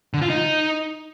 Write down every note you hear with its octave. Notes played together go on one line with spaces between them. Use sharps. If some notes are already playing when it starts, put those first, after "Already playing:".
D3
F4
D#4